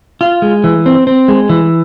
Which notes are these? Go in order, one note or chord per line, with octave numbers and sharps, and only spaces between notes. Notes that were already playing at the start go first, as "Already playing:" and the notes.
F4
G#3
E3
C4
C4
G#3
E3